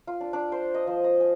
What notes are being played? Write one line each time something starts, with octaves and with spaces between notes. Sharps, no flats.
F4
D4
D4
C5
D#5
F3
D#5
G#5